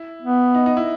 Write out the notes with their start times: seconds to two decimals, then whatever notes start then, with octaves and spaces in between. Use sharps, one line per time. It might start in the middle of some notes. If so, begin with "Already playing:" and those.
Already playing: E4
0.22 B3
0.55 D#4
0.66 D#4
0.77 E4